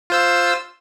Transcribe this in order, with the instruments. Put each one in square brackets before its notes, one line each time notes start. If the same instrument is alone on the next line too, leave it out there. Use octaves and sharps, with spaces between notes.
[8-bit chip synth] F4 C5 E6